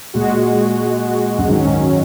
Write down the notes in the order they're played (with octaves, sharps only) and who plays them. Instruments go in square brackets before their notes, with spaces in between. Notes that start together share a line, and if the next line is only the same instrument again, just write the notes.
[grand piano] A#2 [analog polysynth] G#3 F#4
[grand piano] F#2
[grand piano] G#2 [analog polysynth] D#3 F#3 C#4
[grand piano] G#2